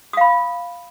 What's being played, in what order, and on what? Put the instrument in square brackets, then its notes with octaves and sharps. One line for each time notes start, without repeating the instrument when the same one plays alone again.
[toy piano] D#6
F5
B5